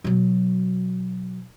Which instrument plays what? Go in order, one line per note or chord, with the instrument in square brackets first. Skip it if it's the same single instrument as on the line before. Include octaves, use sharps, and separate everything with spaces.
[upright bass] B2 F#3